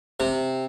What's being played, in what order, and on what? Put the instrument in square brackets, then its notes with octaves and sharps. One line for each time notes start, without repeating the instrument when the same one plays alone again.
[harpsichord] C3